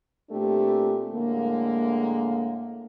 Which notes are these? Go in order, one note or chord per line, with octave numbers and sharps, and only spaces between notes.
A#2 A3 C4 D4 G4
A2 D3 G#3 A#3